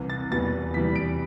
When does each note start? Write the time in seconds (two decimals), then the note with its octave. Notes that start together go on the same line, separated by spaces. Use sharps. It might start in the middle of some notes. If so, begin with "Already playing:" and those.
Already playing: C2 C3 E3
0.10 A6
0.31 E2 B2 G3 B3 A6
0.74 E2 C3 E3 G3 B6
0.96 D7